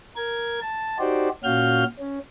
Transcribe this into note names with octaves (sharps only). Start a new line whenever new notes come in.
A#4 G#6
A5
D#4 F#4 G4 C5 D5
A#2 C#4 F#4 F5 F6 G6
C#4